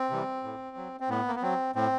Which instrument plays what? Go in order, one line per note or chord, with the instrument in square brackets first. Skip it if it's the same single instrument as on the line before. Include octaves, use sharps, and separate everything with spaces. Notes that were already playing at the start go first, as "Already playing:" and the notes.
Already playing: [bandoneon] C4
C3 E3 G3
A2
F#3
C4
A2 B3
A#3
B3
F#3 C4
A2 C4